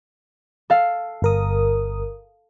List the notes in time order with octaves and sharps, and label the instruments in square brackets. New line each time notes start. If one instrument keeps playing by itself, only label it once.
[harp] A4 F5
[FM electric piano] G1 A#4 D#6